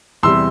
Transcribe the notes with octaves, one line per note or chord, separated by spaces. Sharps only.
E2 C3 G3 C6 E6